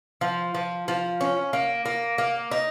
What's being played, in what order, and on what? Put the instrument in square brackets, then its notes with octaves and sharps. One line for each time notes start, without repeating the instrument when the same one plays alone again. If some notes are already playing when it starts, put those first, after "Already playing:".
[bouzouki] F3
F3
F3
C#4
A#3
A#3
A#3
D#4